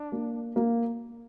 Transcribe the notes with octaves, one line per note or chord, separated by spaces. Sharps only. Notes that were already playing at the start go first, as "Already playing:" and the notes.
Already playing: D4
A#3
A#3